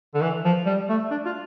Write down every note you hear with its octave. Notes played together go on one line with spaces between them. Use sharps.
D3
E3
F3
G3
A3
D4
F4